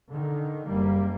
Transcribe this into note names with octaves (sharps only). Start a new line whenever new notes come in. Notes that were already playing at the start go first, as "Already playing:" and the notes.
D3 D#3
F#1 G3 A#3